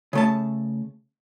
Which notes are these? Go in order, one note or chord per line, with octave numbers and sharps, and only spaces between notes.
C#3 A3 A5